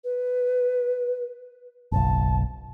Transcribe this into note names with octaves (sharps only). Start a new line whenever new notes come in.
B4
F#1 B1 A5